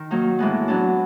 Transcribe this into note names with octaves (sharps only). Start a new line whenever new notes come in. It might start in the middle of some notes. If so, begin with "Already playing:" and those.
Already playing: D#3
F#3 A#3 D#4
A2 E3 G#3 B3
F#3 B3 D4